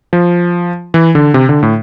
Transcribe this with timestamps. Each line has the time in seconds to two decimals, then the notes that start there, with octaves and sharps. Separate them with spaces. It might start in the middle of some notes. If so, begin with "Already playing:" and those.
0.13 F3
0.94 E3
1.15 D3
1.34 C3
1.49 D3
1.63 A2